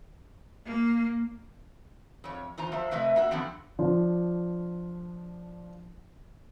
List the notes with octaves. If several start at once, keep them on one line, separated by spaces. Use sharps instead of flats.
A#3
F2 C#5
E2 F4 C5 A#5
F3 C5 E5
C3 A3 B4 D#5 E5
A#3 F#4 E5
D3 E3 F3 B3 C4
F3 D4 F4